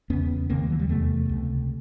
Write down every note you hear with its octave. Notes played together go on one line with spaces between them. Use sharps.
E2 C#3 B3 C#4
D#2 C#3 A#3 C4
A3 B3
E3 F#3
F3 G3
E2 C3 A3 B3
C#2 C3